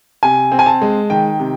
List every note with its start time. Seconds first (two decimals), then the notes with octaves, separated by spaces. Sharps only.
0.23 C3 G#5
0.52 C4
0.59 G#5
0.66 A5
0.81 G#3
1.10 D#3 G5
1.39 C3